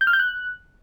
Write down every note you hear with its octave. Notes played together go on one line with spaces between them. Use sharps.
G6
F6
G6
F#6